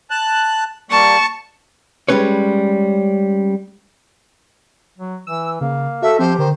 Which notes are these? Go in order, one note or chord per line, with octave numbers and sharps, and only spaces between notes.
A5 F#6
G3 A#3 A5 C#6
G3 G#3 C#4 B4 C#5
F#3
E3 E6
C#3 A#3
F#4 A4 E5
F3 C4 G4 C5
D3 D#3 C5